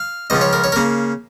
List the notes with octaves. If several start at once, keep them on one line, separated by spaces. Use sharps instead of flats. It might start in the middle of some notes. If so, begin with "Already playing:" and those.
Already playing: F5
C#2 C#3 F3 D#5
C#5
A#4
C#5
A#4
C#3 A#3